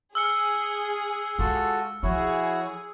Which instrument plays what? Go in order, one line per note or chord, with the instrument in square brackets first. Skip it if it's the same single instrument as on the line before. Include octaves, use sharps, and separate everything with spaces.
[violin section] G#4 [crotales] E6 F6 C#7
[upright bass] G#3 [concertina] F4 F#4 A4
[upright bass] F3 [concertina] E4 F#4 C#5 [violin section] G#4